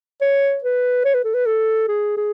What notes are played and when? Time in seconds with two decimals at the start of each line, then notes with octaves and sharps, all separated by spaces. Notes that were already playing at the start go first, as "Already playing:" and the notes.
0.21 C#5
0.64 B4
1.05 C#5
1.14 B4
1.24 A4
1.34 B4
1.46 A4
1.88 G#4
2.17 G#4